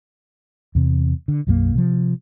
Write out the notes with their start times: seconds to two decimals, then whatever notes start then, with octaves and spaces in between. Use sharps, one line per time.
0.75 E2 C3
1.28 D3
1.47 B1 F#2 E3 A#3
1.75 C3 F3